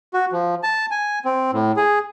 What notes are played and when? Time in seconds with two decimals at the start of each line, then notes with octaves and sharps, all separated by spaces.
0.14 F#4
0.32 F3
0.63 A5
0.91 G#5
1.25 C4
1.53 A2
1.77 G#4